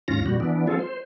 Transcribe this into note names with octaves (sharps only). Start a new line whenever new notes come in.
D#2 G#2 C#4 F4 A#6
F2 A#2 G3 F#4
E3 B3 D4
F3 C4 F4 G#4 A4
C5